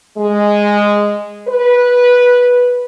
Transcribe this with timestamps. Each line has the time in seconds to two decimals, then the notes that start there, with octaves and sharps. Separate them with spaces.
0.18 G#3
1.48 B4